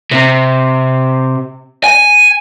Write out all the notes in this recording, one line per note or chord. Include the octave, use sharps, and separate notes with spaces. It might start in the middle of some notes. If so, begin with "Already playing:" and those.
C3
G#5